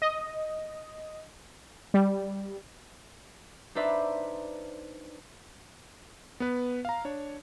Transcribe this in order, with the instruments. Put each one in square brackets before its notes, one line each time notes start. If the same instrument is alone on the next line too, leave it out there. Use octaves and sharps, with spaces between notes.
[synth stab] D#5
G3
[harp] D4 D#4 B4 C5 D5 E5
[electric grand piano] B3 B4
F5 A#5
D4 C#5